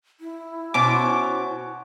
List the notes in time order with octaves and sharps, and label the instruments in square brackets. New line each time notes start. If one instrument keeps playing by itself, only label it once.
[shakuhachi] E4
[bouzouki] B2 C#4 C5 [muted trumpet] F#4 [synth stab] D6